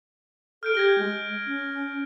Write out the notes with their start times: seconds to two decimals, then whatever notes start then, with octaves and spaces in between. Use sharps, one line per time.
0.63 A4 F6 G6 D7
0.75 G4 G#6 A#6 G7
0.98 G#3
1.46 C#4